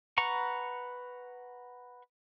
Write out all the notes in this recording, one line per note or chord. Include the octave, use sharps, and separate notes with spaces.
B4 F#5 A#5 C#6